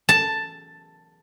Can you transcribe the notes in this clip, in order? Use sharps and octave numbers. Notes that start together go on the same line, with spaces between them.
A5